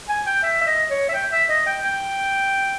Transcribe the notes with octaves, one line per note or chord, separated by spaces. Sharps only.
G#5
G5
E5
E5
D#5
C#5
E5
G5
E5
D#5
G5
G5